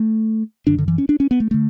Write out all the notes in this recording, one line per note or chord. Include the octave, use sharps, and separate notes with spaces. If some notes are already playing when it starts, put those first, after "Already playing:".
Already playing: A3
F#2 D3 D4
D3
E3
C#4
D4
C#4
B3
A3
D3 A3